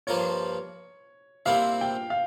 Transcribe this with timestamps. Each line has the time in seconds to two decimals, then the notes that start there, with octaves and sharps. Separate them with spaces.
0.07 G2 F3 A#3 F4 C#5
1.46 A#2 G3 C4 E4 F5
1.81 G5
2.10 F5